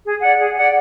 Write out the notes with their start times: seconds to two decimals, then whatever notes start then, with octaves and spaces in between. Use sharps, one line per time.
0.05 G#4
0.22 D5 F#5
0.39 G#4
0.57 D5 F#5